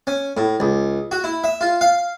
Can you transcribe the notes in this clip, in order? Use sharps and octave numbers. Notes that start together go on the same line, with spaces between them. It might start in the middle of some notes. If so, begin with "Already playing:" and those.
C#4
A2
C#2
F#4
E4
E5
F4
F5